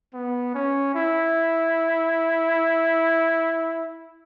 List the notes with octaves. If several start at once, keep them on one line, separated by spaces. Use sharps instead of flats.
B3
C#4
E4